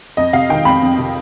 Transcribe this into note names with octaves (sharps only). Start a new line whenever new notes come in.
F2 D#5
C3 F5
D#3 G5
F2 B5
F2
C3